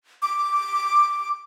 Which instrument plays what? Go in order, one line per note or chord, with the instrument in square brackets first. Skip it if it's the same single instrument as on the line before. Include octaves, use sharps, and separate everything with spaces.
[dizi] D6